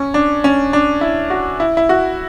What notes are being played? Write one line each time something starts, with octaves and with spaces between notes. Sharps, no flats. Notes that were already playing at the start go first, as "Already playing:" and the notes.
Already playing: C#4
D4
C#4
D4
E4
F#4
E4
E4
F#4